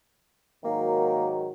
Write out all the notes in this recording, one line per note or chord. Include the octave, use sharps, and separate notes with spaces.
G#2 D#3 F#3 A#3